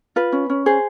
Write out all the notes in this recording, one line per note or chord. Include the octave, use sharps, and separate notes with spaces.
F4 B4
C#4
C#4
G#4 C5